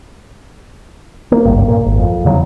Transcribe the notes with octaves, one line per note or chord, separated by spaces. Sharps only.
A#3
G#1 C#2 G2
A#2
G#1
F2
E2 C#3 F#3